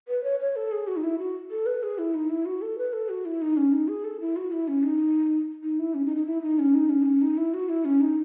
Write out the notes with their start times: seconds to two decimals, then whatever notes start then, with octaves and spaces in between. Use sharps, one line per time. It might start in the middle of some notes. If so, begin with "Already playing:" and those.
0.08 B4
0.24 C#5
0.39 C#5
0.56 A4
0.72 G#4
0.87 F#4
0.96 D#4
1.04 E4
1.18 F#4
1.51 A4
1.66 B4
1.83 G#4
1.98 E4
2.14 D#4
2.30 E4
2.46 F#4
2.62 A4
2.78 B4
2.93 A4
3.09 F#4
3.25 E4
3.42 D#4
3.57 C#4
3.72 D#4
3.88 G#4
4.04 A4
4.20 E4
4.36 F#4
4.52 E4
4.68 C#4
4.83 D#4
5.63 D#4
5.79 E4
5.94 C#4
6.05 D#4
6.16 D#4
6.26 E4
6.42 D#4
6.59 C#4
6.74 D#4
6.89 C#4
7.02 D#4
7.05 C#4
7.21 D#4
7.37 E4
7.54 F#4
7.69 E4
7.85 C#4
8.01 D#4